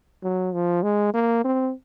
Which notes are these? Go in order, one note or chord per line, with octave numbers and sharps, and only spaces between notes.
F#3
F3
G#3
A#3
C4